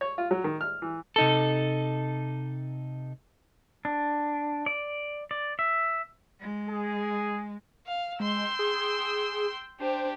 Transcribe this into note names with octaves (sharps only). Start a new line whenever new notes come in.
C#5
F4
F#3
D#3
F6
E3
C3 D#4 A4
D4
D5
D5
E5
G#3
G#4
F5
G#3 G5 C6 E6
G#4
D4 G4 C5